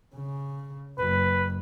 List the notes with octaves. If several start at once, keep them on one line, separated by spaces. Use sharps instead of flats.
C#3
F#1 B4